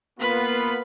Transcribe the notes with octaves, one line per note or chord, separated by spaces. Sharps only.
A#3 B3 F4 B4 B5